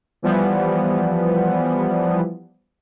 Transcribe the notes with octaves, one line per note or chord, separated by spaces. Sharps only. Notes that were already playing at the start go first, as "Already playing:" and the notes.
E3 F3 G3 B3